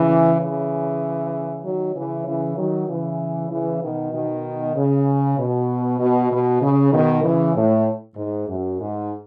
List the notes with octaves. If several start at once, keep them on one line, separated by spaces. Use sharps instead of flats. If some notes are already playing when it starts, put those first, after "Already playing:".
Already playing: C#3 E3
C#3 E3
D#3 F#3
C#3 E3
C#3 E3
D#3 F#3
C#3 E3
C#3 E3
B2 D#3
B2 D#3
C#3
B2
B2
B2
C#3
B2 D#3
C#3 E3
A2
G#2
F#2
G#2